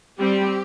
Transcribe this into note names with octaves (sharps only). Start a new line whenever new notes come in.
G3 C4 G4